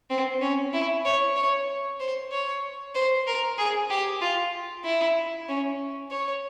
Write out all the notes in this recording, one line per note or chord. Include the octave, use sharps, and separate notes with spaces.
C4
C#4
E4
C#5
C#5
C5
C#5
C5
A#4
G#4
G4
F4
E4
C#4
C#5